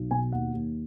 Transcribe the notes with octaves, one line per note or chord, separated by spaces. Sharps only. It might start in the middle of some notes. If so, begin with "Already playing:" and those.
Already playing: B1
B2 G#5
D#2 F#5
D#2